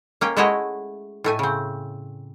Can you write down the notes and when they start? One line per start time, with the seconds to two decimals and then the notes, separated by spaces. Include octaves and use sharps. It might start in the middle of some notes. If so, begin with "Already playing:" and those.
0.21 A#3 C#4 G5
0.36 G#3 A3 E4 F#4 C#5 D#5
1.24 A2 A3 G#5
1.39 C#3 C4